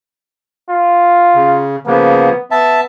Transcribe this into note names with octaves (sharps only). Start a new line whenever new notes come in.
F4
C#3
C#3 F3 A#3 B3
B3 E5 A5